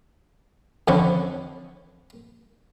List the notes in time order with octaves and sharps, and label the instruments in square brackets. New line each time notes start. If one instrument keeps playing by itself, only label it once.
[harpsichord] F2 D3 F3 C#5 B5 C#6